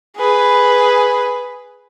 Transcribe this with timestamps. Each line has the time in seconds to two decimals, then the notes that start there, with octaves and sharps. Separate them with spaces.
0.17 G#4 B4